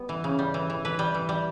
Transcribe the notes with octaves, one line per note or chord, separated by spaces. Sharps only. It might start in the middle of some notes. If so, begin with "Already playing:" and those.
Already playing: G3 B3
E3
C#3
G3
E3
E3
E3 B4
G3
E3
G3